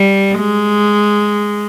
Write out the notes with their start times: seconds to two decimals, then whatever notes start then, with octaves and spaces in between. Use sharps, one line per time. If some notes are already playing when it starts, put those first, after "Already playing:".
Already playing: G3
0.39 G#3